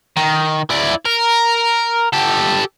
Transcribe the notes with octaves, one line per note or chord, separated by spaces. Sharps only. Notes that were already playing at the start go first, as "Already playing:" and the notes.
D#3
E4 D5
A#4
G4 A4